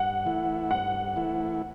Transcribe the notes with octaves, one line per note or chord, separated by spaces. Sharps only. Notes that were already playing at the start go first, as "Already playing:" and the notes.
Already playing: G2 F#5
E3 A3 E4
G2 F#5
E3 A3 E4